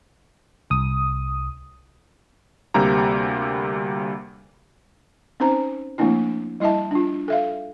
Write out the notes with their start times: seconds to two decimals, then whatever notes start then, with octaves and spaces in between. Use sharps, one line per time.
0.70 C2 D#6
2.74 D2 C3 G3 A#3 G4 A#5
5.40 C4 C#4 D#4 C5 A#5
5.98 F3 A3 A#3 C4 D4 E4
6.60 G3 E4 D#5 E5 A5
6.91 D4 F4
7.28 A4 E5 F5